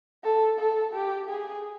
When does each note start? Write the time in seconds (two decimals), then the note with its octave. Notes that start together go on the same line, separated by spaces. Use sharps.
0.24 A4
0.59 A4
0.93 G4
1.29 G#4